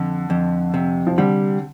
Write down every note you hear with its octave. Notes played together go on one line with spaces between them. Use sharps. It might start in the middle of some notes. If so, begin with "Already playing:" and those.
Already playing: F2 D3
F2
C3
F3
D3 G3